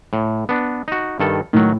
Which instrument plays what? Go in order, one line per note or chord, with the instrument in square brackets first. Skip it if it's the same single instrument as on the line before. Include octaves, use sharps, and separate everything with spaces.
[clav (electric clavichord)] A2
B3 D4
D#4 F#4
G2 D#3 A4
[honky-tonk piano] A2 [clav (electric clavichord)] D#3 F#3